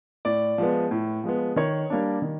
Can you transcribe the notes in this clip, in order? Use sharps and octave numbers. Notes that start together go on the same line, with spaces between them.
A2 D5
F3 G#3 B3
A2
F3 G#3 B3
D#3 C#5
G3 A#3 D4
D#3